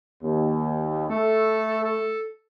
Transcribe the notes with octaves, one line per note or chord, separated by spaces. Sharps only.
D#2
A3 A4
A4